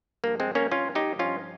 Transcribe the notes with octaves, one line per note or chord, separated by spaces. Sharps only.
G2 F3 A#3
G#3 C4
A#3 C#4
C#4 F4
D#4 G4
G2 F3 C#4 F4